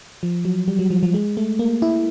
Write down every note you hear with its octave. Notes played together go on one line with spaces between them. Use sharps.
F3
F#3
G3
F#3
F3
F3
G#3
A3
A#3
E4